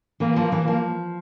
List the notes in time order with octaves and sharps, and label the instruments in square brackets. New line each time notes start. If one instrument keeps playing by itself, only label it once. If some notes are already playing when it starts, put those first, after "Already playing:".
[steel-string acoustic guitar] E3 [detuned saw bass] A#3
[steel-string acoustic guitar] F3
E3
F3